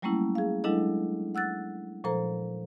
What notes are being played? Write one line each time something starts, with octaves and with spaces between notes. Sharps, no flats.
F#3 G3 A3 A#3 C#4 E4
G#4 F5
F#3 G#3 D4 E4 A4 D#5
F#5 E6 F#6 A6
A#2 F3 A4 C5 A#5